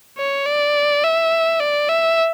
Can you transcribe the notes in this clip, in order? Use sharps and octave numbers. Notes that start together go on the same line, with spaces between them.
C#5
D5
E5
D5
E5